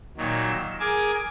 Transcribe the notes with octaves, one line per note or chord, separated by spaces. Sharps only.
A#2 D#3 F#3
E6
G#4 A#4 G#5 D6